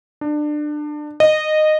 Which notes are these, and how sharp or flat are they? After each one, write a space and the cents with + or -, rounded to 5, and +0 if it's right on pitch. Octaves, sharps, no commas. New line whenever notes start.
D4 +25
D#5 -15